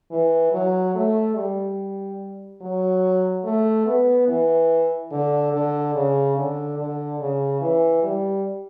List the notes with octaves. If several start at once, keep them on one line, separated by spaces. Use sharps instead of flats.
E3
F#3
A3
G3
F#3
A3
B3
E3
D3
D3
C#3
D3
D3
C#3
E3
G3